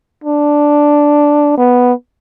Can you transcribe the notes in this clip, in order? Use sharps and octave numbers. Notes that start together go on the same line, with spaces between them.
D4
B3